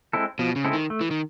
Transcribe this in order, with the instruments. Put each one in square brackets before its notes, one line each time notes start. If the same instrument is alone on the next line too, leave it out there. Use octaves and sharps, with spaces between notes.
[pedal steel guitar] G#3 C4 E4 A4
[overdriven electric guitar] B2 [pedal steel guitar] F3
[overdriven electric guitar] C#3
[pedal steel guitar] G#3 C4 E4 A4
[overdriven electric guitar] D#3
[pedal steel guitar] A3
[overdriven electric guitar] E3
D#3